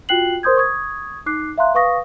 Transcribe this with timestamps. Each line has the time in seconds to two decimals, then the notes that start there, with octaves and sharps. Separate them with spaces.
0.09 F4 F#4 G5 F#6 C7 F#7
0.43 A#4 C5 C6 D#6 G6 G#6
0.57 C#6 D#6 G#6
1.26 D#4 D6 F#6 C7
1.58 E5 F5 A#5 C6 F#6
1.75 B4 F5 C#6 D#6 A#6